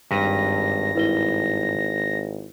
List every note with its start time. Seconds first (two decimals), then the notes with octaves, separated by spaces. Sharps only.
0.11 G#1 G2 A#6 B6 D#7
0.95 G#1 E4 B4 G7